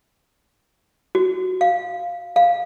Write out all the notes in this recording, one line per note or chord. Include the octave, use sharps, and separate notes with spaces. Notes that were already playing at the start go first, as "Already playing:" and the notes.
F#4
F5
F5